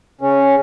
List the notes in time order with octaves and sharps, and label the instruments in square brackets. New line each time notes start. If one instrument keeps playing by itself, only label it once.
[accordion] C#3 C#4